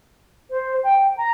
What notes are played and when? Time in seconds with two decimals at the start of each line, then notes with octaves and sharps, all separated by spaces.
0.50 C5
0.84 G5
1.17 A#5